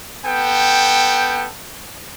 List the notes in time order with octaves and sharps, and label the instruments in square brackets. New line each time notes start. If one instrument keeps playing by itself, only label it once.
[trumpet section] B3 A4 G5